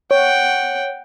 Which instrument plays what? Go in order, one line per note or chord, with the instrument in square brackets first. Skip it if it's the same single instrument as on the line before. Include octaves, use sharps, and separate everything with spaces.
[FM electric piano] C#5 [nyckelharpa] F#5 G5